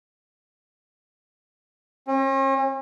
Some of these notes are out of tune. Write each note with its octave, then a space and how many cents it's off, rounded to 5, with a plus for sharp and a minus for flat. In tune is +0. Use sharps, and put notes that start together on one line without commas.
C#4 -45